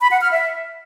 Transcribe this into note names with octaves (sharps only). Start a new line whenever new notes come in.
B5
F#5
F6
E5